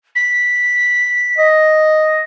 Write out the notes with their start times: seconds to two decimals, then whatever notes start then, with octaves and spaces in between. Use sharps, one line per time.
0.15 B6
1.38 D#5